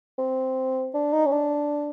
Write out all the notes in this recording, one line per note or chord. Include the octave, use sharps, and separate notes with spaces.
C4
D4
D#4
C#4
D4